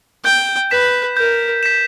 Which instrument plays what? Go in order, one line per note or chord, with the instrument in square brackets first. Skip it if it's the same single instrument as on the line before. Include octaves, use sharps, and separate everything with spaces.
[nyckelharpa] G5 [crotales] G6
[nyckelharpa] B4 [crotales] B6 E7
[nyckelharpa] A#4 [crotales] G6
[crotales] B6 E7